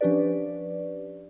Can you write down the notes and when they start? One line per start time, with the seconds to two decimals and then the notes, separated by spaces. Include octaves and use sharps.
0.01 F3 C#4 D4 G4 B4 D5